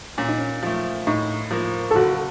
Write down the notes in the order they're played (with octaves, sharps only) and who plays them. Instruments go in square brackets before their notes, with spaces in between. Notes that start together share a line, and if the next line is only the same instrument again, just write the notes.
[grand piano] A#2 [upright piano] C#4
[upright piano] D#4
C#4
[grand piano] F3 A3
[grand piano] A2 [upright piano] D#4
[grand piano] F3 A#3
[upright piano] A4
[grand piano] F#1 [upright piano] F#4